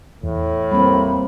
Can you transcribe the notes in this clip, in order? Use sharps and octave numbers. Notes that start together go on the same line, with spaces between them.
E2 A2
G3 A#3 C4 B5